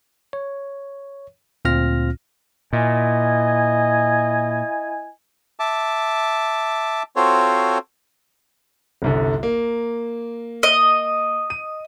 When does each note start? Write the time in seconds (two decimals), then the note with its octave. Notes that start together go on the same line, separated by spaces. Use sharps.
0.33 C#5
1.65 D2 A#2 C4 F4 F6 A#6
2.73 A#2 E4 D#5 G#5
5.60 E5 A5 D6
7.16 C4 F4 F#4 A4 C5 C#5
9.02 G1 C2 D3
9.43 A#3
10.63 D#5
11.50 D#7